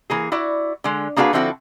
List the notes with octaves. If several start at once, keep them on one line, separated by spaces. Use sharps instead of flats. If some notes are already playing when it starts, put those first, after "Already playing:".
E3 A#3 G#4
E4 F#4 D5
D3 G#3
A#3 D4 F#4 G#4 B4 F5
D3 F3 C4 E4 F#4 A4